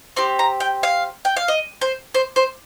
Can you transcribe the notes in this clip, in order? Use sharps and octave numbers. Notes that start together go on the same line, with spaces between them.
C4 G4 C6
A#5
G5
F5
G5
F5
D#5
C5
C5
C5